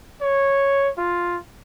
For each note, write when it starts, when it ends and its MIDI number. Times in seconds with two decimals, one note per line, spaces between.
0.21 0.89 73
0.98 1.37 65